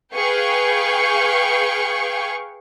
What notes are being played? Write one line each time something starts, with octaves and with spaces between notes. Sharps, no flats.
G#4 B4 F5 G5 C#6